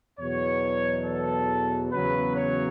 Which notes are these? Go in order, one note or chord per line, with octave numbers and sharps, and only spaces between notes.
E2 B2 F#3 C#5
A4
E2 C#3 F#3 B4
C#5